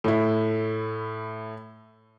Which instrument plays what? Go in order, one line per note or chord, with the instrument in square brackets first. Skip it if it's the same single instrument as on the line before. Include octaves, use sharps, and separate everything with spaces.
[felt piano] A2 E4